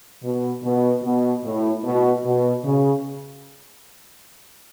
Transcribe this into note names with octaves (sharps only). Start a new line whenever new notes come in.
B2
B2
B2
A2
B2
B2
C#3